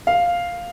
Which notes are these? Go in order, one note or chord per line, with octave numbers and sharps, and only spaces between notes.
F5